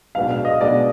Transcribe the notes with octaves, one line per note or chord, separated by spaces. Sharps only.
B1 B2 G#3 D4 F5
F5
D#5
B1 B2 G#3 D4 D5